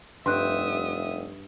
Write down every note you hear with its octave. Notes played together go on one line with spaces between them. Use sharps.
F1 G2 E5 G5 C6 D#6 F#6